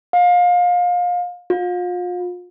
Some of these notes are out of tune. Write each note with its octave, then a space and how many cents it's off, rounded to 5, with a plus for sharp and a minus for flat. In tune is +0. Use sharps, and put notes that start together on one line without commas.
F5 +30
F4 +35